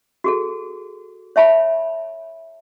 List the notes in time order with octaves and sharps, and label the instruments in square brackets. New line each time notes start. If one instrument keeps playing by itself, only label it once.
[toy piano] F#4 G#4 A4
C#5 E5 A5 B5